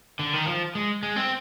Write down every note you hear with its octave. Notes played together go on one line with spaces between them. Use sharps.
D3
D#3
F3
G#3
G#3
C4